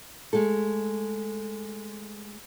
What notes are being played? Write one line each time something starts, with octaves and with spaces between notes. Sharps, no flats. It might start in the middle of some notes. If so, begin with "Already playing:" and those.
G#3 A3 A4